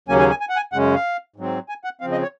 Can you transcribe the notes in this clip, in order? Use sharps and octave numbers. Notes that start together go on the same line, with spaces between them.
D#2 C#3 F#3 A#3 C#4 G#5
G#5
G#5
G#5
F#5
G#5
F#2 C#3 G#3 C#4 F#5
F5
G#2 F#3 C4
G#5
F#5
C#3 F3 C4 F5
D#5
C#5